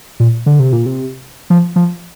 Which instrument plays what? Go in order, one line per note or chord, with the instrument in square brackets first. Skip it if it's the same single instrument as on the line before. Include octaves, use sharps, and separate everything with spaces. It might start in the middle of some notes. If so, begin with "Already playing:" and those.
[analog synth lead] A#2
D3
C3
A#2
C3
F3
F3